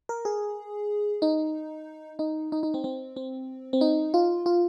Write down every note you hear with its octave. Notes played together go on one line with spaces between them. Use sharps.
A#4
G#4
D#4
D#4
D#4
D#4
C4
C4
C4
C4
D#4
F4
F4